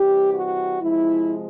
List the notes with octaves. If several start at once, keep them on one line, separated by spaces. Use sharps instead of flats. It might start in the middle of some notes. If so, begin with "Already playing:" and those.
Already playing: C3 E3 G3 G4
F#4
C3 F3 G#3 E4